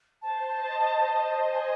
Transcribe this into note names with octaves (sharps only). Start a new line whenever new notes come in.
C5 A5
D#5
G#5